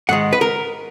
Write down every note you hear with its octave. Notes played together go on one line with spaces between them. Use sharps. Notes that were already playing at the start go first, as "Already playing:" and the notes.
G#2 D#3 G#3 F#5
B4
A#4